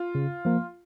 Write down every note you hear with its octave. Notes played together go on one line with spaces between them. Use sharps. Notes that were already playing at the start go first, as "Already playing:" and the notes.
Already playing: F4
C#3
F3 A#3